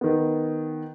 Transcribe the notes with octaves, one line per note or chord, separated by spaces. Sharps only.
D#3 B3